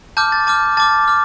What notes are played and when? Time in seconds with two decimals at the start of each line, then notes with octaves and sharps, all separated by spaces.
0.17 A5 D6 F6 G6
0.32 A6
0.47 A5 D6 F6
0.77 A5 D6 F6 A6
1.08 D6 F6